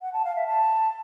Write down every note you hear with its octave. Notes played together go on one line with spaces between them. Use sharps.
F#5
A5
F5
E5
A5